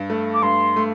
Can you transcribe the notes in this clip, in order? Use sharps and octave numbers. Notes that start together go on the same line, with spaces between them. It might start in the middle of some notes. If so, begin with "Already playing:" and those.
Already playing: G2
A3
D6
G2 C6
A3